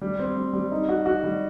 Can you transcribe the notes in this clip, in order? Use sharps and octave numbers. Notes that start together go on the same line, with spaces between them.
G3
C4
G3
G3
D#4
F#4
F#4
G3